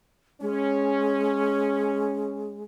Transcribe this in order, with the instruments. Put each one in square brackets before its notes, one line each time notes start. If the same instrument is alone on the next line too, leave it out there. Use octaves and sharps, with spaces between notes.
[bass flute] G#3 [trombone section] C#4